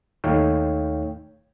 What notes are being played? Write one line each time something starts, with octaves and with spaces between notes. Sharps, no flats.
D#2 A3 D#4 C#5 F5 G5